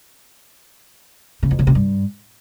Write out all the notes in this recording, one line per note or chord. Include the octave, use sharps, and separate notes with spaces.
C#3
F2
C#3
C3
G2